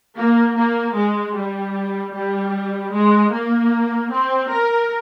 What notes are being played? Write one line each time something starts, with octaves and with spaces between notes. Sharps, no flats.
A#3
A#3
G#3
G3
G3
G#3
A#3
C4
A#4